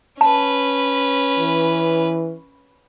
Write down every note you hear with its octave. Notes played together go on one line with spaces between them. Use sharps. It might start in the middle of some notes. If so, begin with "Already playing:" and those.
C#4 B4 A5
E3